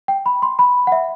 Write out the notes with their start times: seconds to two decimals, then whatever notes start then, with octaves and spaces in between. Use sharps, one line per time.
0.08 G5
0.26 B5
0.42 C6
0.59 B5
0.87 F#5
0.92 E5